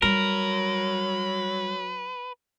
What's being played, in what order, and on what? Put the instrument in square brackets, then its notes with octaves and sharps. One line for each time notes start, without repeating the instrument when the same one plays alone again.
[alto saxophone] F#3 [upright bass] G3 [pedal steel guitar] A#4 [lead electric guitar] B4